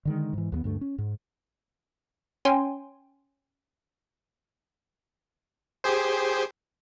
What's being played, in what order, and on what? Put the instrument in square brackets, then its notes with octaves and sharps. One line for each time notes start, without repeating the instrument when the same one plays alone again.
[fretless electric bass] D3 D#3 G#3
G#2 E3
D#2 G3 B3
D2 G2 A3
C#4
G#2
[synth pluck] C#4 C#5 G5 G#5 C6
[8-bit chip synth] G4 G#4 C5